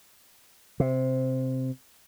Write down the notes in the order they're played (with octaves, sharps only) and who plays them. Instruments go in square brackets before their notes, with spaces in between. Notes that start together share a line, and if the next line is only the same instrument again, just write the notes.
[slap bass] C3